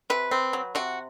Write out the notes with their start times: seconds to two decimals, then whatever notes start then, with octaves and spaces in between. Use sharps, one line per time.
0.10 C3 B4
0.31 C4
0.53 F#3
0.75 C3 F#4